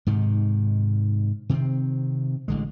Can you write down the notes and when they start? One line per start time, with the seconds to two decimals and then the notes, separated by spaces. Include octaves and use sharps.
0.07 G#2 C3 D#3
1.50 C3 D#3 C4
2.48 A1 D3 G#3